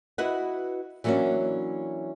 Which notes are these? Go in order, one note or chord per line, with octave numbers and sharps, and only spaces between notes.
E4 F#4 B4 D#5 F#5
E3 F#3 A#3 C#4 D4 F#4